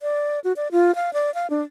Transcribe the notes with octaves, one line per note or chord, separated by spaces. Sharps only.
D5
F#4
D5
F4
F5
D5
F5
D4